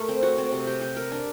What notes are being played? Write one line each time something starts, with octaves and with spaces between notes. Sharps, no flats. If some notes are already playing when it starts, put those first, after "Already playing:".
Already playing: A3 A#4
C4
F#4
C4
C3
G4
G4
A#4
D4